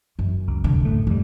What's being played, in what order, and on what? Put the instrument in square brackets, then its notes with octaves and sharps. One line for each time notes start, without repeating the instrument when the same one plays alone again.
[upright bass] F#2
[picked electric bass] C#2
[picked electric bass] C2 [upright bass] D3
[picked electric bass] F#2 A2 A3
[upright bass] F1 [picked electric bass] F2 G#2 G3